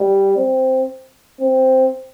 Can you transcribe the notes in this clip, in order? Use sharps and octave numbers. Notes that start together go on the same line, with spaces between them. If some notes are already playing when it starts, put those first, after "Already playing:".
Already playing: G3
C4
C4